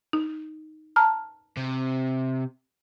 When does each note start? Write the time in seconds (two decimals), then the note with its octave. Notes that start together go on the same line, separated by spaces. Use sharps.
0.13 D#4
0.96 A5 A#5 F6
1.57 C3